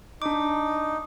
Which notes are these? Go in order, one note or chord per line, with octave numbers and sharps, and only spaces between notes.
D4 D#4 D6